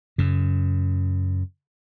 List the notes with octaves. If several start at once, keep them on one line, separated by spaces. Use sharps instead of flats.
F#2 C#3